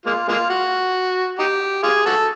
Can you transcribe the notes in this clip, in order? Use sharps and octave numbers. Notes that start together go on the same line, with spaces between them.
G#3 A#3 F4
G#3 A#3 F4
F#4
D#4 G4
F4 G#4
F#4 A4